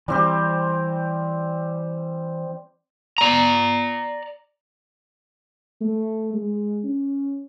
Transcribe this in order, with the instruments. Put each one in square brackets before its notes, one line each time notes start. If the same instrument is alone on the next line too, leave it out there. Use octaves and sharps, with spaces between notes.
[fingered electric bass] E3 [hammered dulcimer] G3 C4 G4
[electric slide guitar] D5 A#5
[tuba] A3
G#3
C#4